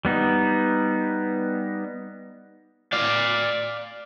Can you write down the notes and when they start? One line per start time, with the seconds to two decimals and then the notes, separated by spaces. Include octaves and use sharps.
0.05 G3 B3 D#4
2.93 D5 F5